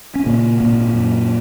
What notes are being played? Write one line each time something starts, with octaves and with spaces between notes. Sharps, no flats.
C#4
A#2 C#3 A#3
G#1 A#2 A#3
F#2